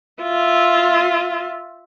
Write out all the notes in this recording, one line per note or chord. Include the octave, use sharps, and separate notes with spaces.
F4 E5